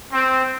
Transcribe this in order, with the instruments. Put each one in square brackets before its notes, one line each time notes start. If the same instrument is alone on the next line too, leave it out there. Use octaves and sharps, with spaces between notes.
[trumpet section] C4